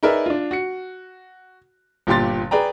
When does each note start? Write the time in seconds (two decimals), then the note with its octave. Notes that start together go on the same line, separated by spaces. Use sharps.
0.03 D#4 G#4 A#4 B4 D5 E5
0.26 D4 F4
0.51 F#4 C#7
2.07 G1 A#2 G4 C6 A6
2.51 G#4 B4 D5 G5 A#5